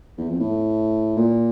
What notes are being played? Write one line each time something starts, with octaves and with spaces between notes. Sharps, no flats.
E2
F2
A2
A#2